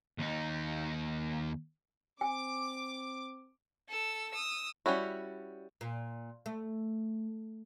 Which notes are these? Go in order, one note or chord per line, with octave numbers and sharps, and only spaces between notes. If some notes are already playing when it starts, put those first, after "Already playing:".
D#2 D#4
C4 G#5 D6
A4 E6
D#6 E6
G3 C#4 E4 F#4
A#2
A3